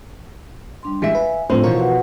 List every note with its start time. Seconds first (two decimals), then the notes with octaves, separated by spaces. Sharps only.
0.83 G3 D4 C6
1.02 E3 G3 G#3 F4 E5 G#5
1.15 B4
1.50 A2 F3 C4 D4 C5
1.64 B2 E3 A#4 C#5 F5
1.76 F#4 B4 F#5